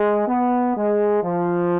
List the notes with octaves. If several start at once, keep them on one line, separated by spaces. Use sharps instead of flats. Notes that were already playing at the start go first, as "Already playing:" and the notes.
Already playing: G#3
B3
G#3
F3